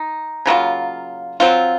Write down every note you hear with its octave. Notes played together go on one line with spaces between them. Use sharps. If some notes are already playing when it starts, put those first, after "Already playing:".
Already playing: D#4
C#3 F#3 A#3 F4
F#3 C4 F4